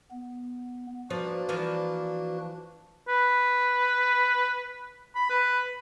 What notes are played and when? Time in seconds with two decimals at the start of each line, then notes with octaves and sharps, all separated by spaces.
0.11 B3
1.10 F3 A#3 D4 F#4 B4
1.49 E3 F3 D5
3.09 B4
5.15 B5
5.30 B4